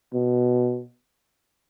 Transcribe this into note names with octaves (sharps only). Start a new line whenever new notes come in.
B2